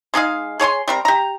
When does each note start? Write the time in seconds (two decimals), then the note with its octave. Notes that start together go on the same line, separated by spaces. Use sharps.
0.14 G#3 D#4 G#4 F5
0.60 G#4 C#5 G#5 C6
0.88 G3 C4 A#4
1.05 G4 A#5